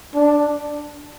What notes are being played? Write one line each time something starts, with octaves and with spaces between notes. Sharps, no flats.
D4